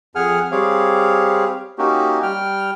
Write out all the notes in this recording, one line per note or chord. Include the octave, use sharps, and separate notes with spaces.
F2 G#4 F#5 G#5 F6
G3 C4 G4 G#4 C#5 F5
A#3 C#4 D#4 F#4 G4
G3 G5 F6